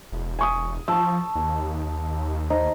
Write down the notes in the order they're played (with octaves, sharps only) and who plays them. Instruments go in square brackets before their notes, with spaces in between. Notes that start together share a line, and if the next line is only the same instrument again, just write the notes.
[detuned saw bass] E1
[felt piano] G#5 C#6 D#6
[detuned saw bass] F3 [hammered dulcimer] A5 C#6 [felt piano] E6
[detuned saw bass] D#2
[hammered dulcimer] D#4 [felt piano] C5